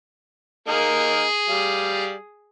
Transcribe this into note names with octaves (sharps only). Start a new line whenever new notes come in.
A#3 D#4 G#4 A#4
G3 F5